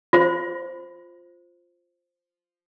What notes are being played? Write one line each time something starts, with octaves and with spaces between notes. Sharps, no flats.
F4 C5